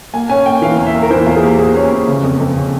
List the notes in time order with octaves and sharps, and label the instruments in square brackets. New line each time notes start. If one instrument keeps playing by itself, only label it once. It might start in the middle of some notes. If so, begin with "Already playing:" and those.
[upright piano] A#3 G#5
C#4 G#5
A#3 G5
E3 F5
E2
E5
A#3
A#4
E3 C5
E2 F4
G#4
A#3 G4
A#3 G#4
C#4
E2
C#3
F2
F2
C#3